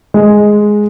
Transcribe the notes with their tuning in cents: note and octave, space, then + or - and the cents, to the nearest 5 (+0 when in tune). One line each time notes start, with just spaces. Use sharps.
G#3 +5